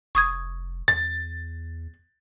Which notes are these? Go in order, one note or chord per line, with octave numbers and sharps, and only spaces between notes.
F1 C#6 D#6 G#6
E2 A6